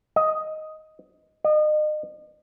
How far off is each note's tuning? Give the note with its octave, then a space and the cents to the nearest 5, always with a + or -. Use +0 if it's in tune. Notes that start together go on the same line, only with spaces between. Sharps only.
D#5 +5
D#5 -35